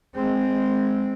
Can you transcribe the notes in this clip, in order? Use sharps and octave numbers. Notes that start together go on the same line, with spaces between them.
G#3 C4